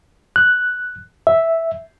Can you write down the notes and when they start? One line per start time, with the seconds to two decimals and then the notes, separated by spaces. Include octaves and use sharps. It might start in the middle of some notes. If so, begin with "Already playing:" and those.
0.36 F#6
1.27 E5